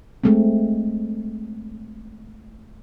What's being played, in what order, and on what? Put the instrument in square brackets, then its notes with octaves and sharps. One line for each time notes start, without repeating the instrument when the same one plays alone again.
[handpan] G#3 A3 C4